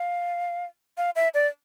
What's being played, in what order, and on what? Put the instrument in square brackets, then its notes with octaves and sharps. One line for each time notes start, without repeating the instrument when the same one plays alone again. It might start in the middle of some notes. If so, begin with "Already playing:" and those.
Already playing: [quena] F5
F5
E5
D5